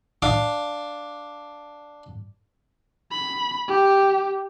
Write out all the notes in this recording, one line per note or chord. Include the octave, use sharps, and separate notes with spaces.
D4 F5 D6
B5
G4